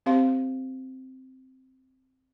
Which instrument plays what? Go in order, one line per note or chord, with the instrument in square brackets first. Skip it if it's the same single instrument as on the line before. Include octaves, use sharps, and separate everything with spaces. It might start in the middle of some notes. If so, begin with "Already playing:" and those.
[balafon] C4 G4 C5 F5 C6